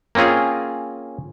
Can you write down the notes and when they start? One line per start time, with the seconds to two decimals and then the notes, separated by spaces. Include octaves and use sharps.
0.15 A#3 C4 C#4 F4 G#4